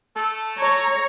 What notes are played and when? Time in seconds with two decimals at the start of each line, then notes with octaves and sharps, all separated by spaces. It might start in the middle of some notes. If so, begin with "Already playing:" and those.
0.17 A3 A4
0.57 C#5 A#5